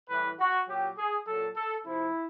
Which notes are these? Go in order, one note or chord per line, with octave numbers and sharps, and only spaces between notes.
A2 E3 G3 B4
F#4
A#2 F#3 G4
G#4
A#2 F#3 A4
A4
C3 F3 E4